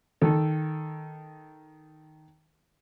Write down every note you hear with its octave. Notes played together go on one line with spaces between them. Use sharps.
D#3 A4